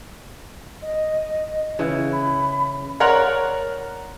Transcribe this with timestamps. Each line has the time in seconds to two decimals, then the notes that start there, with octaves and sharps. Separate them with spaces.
0.82 D#5
1.79 C#3 E3
2.13 B5
3.00 A#4 C#5 D5 F#5 A#5 C6